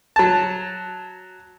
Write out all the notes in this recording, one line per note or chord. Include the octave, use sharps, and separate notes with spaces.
F#3 A5